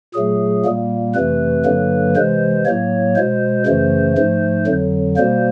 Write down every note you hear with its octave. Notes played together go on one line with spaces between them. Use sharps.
A#2 F#3 A3 G#4
A#2 G3 A#3
F2 C3 E3 A3 B4
G2 D3 F#3 A#3
C3 E3 G#3 C5
A2 F#3 A#3 C#5
B2 G#3 C5
F#2 C#3 E3 A3 C5
G#2 F3 A3
F2 D3 F#3
B2 G3 A#3 C5